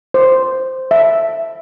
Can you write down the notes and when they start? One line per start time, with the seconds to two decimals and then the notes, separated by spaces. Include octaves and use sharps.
0.14 C5
0.91 E5